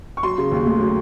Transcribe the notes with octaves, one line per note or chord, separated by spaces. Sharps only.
C#6
F#3 C6
C#3
D#2
A3
F#3